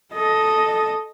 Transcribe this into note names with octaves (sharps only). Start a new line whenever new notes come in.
A4 D#5